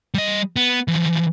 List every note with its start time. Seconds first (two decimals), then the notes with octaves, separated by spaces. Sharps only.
0.14 G3 D#5
0.56 B3
0.88 E3 F3